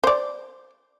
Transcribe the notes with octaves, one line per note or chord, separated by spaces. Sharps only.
C5 D5